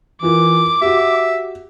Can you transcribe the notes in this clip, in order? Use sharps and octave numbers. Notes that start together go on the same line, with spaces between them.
E3 E4 F4 A#4 D6
F#4 G4 E5